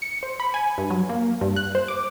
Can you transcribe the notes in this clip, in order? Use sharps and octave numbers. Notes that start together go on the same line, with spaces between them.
C#7
C5
B5
G#5
G2
F#3
A#3
G2
F#6
C5
D6